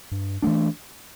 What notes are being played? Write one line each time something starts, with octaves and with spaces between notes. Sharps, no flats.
G2
E3 A3 D4